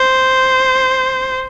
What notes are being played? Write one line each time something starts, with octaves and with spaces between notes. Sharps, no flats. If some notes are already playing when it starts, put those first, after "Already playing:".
Already playing: C5